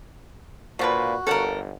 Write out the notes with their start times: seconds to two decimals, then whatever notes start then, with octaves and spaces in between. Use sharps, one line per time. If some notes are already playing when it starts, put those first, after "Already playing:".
0.79 A#2 F3 D4 F#4 B4
1.27 G1 A#3 A4 A#4 C#5 F#5